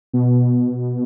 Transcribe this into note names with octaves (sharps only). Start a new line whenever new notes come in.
B2